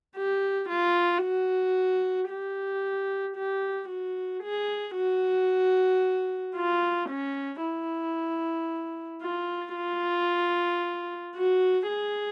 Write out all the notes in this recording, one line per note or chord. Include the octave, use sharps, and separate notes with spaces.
G4
F4
F#4
G4
G4
F#4
G#4
F#4
F4
C#4
E4
F4
F4
F#4
G#4